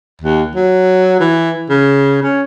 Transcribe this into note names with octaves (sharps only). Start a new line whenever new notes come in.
D#2
F#3
E3
C#3
C#4